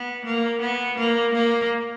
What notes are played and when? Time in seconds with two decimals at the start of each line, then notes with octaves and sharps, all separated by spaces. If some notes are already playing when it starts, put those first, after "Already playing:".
Already playing: B3
0.25 A#3
0.61 B3
0.98 A#3
1.34 A#3